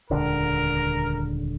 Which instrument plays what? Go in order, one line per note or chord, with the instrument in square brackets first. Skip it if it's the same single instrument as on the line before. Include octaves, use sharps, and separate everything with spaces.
[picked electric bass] D#1 C#2 D3 [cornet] A#4